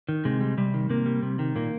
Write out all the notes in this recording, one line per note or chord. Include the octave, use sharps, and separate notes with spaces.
D#3
C3 G#3
G3
C3 G3
D#3
C3 A#3
G3
C3
D#3
A#2 A#3